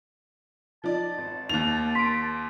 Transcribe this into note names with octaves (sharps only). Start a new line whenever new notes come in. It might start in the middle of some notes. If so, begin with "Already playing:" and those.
F3 D#4 D5 A5
G#1
D#2 D#3 A#3 F7
A#3 C6 B6 D7